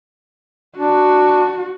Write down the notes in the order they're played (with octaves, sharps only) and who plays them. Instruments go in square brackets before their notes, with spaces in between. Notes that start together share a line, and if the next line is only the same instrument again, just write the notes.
[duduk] D4 [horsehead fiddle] F#4